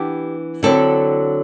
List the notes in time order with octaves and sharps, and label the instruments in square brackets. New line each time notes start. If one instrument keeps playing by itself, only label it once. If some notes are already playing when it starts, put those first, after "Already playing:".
Already playing: [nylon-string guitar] E3 B3 D4 G4
D3 F#3 C4 E4 A4